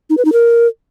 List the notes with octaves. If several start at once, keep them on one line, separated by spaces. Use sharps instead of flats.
D#4
B4
D#4
A#4